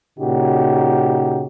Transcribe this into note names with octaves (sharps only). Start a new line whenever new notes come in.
A#2 C#3 D#4 F#4 G4